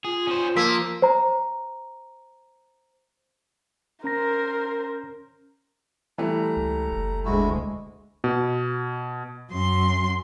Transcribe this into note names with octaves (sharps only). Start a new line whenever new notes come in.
F4 G#4
C#4 C5
F3 A#3 E6 B6
C5 A#5
C#4 A#4 C5 A#5 A#6
E3 G3 A3 A#5
C#2
F#1
D2 G#3 E4 F#4
B2
F#2 C6